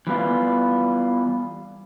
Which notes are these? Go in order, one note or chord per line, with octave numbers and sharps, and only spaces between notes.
E3 G3 B3 F4